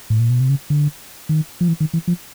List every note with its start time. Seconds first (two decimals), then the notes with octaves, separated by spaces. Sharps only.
0.10 A2
0.20 A#2
0.30 B2
0.40 C3
0.49 C#3
0.70 D3
1.29 D#3
1.61 F3
1.68 E3
1.80 D#3
1.94 E3
2.08 F3